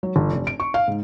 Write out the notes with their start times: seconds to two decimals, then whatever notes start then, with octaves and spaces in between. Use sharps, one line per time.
0.03 F#3
0.16 G1
0.32 F1
0.47 D7
0.60 C#6
0.74 F5
0.88 G#2